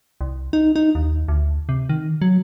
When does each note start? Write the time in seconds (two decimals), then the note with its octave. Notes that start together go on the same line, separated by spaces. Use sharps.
0.21 C2
0.53 D#4
0.76 D#4
0.95 D#2
1.28 D2
1.69 C3
1.89 D#3
2.22 F#3